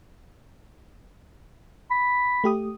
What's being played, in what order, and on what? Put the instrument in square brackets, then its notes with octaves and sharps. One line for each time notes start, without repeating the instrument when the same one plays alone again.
[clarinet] B5
[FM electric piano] A3 G4 D#6